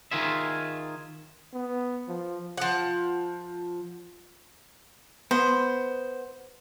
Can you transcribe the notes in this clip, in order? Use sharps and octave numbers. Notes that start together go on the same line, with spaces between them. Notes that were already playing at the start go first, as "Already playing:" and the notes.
D#3 F4 G#4 E5
B3
F3
F3 F#5
B3 C5